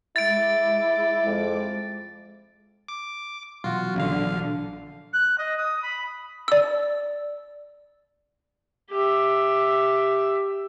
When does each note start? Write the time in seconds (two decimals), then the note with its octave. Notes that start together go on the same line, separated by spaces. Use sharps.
0.16 G#3 E4 D6 A6 D7
1.26 F2
2.88 D6
3.64 B2 E3 F#3 F4 F#4
3.96 A#1 D3 F5
5.13 F#6
5.38 D#5
5.57 D#6
5.82 B5
6.48 D5 E6
8.90 G4 E5